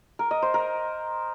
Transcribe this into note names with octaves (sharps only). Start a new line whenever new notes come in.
A#4
D#5
C5
A#4